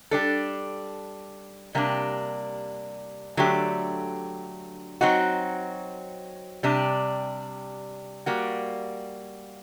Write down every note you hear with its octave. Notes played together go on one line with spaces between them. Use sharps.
G3 D4 A4
C3 G3 A#3 D4
D3 F#3 A3 D4 G4
F#3 C4 D#4 F#4
C3 G3 D4
G3 A#3 F#4